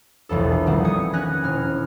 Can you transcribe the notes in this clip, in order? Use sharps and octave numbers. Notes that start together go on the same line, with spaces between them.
E1 A#1 E2 A4
D#3 G3 B3 C4
G#5 D#6 C#7
C#4 G#5 F#6 A#6
E1 F6